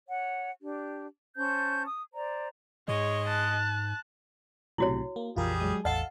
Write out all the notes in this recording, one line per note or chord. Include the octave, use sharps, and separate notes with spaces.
C#5 F#5
D4 G4
C#4 C5 A5 G6
D#6
C5 D5 A#5
G#2 G#3 C#5 D#5
A5 F#6
B1 A2 C3 E4 F#4 C#5
A#3
A#1 F2 E3 G3 F4 G#4 A#4
F#3 G#3 D#6
A1 E2 A4 D#5 F5 F#5 A5